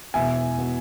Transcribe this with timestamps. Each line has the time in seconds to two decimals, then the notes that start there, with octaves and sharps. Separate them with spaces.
0.14 E1 E2 B2 B3 E5 G#5
0.58 B2 B3